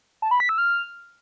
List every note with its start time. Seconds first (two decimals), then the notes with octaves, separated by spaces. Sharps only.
0.22 A5
0.31 B5
0.40 B6
0.49 E6
0.58 F6